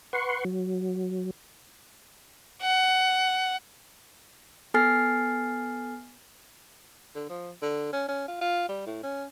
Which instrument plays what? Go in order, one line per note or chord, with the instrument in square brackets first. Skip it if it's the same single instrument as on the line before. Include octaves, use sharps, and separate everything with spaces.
[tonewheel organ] B4 F#5 C6 C#6
F#3
[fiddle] F#5
[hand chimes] B3 A4 G#5 F6 A6 C7
[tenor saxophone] D3
F3
D3
C#4
C#4
F4
F4
G3
A2
C#4